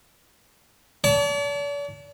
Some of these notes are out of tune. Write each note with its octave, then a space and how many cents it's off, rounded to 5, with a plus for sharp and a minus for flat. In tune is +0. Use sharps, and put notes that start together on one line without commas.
D5 -45 A5 +0